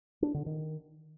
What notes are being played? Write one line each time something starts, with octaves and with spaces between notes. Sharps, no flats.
D4
D3
D#3